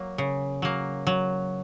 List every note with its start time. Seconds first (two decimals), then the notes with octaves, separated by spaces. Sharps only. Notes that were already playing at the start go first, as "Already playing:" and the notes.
Already playing: F#3 A#3
0.18 C#3
0.62 F#3 A#3
1.07 F#3